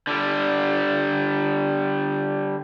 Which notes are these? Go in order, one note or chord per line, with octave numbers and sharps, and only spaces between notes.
D3 G3